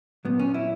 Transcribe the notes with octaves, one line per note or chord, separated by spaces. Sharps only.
A#2 F#3 B3
C#4
E4